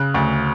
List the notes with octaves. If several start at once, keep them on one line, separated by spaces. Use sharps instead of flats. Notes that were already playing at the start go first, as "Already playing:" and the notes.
Already playing: C#3 F#6
D2